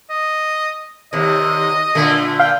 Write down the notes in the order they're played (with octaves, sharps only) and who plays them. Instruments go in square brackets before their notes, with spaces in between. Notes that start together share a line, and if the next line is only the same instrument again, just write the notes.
[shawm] D#5
[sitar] D#2 C3 [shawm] D#5
[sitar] A#2 D3 A3
[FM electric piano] F5 [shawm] G5